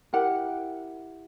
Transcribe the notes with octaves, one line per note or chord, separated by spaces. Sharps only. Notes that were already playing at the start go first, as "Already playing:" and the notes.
E4 G4 A#4 F#5